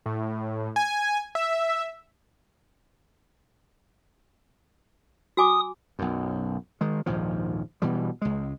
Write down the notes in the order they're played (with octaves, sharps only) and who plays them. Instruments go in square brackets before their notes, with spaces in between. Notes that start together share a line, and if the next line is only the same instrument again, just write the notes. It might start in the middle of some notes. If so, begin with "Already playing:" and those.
[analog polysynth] A2
G#5
E5
[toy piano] F#4 G#5 D6 [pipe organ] D#6
[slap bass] B1 F#2
D#3 G#3
A#1 D#2 G#2 F3
B2 E3 G3
C#2 G#3